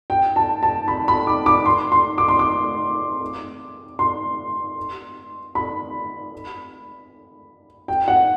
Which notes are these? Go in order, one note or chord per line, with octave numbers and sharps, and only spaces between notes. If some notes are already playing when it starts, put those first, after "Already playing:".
G5
A5
A5
B5
B5
D6
D6
C6
C6
D6
C6
D6
C6
B5
G5
F#5